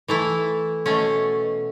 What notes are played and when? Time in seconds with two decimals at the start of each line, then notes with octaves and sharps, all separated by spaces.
0.08 E3 A3 E4
0.86 B2 A3 C#4